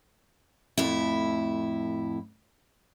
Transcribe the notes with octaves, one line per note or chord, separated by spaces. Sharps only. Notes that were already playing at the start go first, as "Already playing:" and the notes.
F2 A2 E4